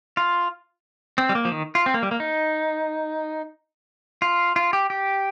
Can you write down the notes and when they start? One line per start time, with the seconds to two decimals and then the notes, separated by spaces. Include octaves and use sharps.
0.17 F4
1.18 C4
1.29 G3
1.35 A#3
1.45 F3
1.52 D#3
1.75 F4
1.86 C4
1.94 A#3
2.03 G3
2.11 A#3
2.20 D#4
4.22 F4
4.56 F4
4.73 G4
4.90 G4